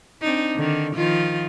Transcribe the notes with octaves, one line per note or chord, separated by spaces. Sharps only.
C4 D4 D#4
D3 D#3
D#3 F3 F4